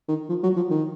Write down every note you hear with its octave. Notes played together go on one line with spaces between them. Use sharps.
D#3
F3
F#3
F3
D#3